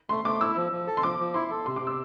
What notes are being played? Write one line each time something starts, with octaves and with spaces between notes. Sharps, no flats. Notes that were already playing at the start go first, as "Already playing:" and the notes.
A3 C6
A3 D6
E4 E6
F3
F3
A4
C6
F3 D6
F3
E4 C6
A4
C3 C6
D6
C3
E6